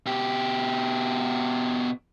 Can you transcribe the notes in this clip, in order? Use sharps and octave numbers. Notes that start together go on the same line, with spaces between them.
B2 G4